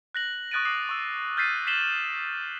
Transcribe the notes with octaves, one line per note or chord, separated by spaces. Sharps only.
F#6 A#6 F#7
C#6 D#6 F#6 A6 D7 D#7
D6 D#6 C7 F#7
C#6 E6
F6 G6 A6 B6 C7 D#7
B6 C7 E7 F#7 G7